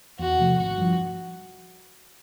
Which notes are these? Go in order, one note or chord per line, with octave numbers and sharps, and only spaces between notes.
E2 F#4
C3 F3 A3
G#1 F#4
G2 D3 F3